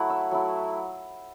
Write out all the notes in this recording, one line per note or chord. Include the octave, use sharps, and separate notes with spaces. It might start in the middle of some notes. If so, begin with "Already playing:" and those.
Already playing: F#3 A3 E4 F#5
E5
F#3 A3 E4